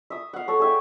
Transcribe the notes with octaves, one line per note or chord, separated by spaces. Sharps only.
E5 D#6
F5 F#5
A4 C#5
G#4 E5 G5